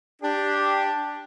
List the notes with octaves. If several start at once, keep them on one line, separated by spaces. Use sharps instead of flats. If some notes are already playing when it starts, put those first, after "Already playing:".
D4 G4